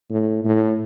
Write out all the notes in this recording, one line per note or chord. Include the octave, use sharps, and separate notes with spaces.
A2
A2